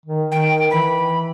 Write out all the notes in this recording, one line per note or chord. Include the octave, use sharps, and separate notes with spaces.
D#3
D#3 G5
E3 B5